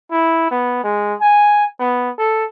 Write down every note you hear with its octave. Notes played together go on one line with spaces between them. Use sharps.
E4
B3
G#3
G#5
B3
A4